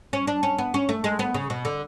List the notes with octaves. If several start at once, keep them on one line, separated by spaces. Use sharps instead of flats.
C#4
D4
C#4
B3
C#4
A3
G#3
B3
C#3
B2
D3